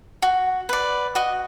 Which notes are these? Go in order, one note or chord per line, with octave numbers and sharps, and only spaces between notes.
F#4
B4 D5
F#4 D#5